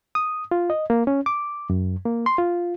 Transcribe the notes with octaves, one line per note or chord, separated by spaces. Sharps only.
D#6
F4
D#5
A#3
C#4
D6
F#2
A#3
C6
F4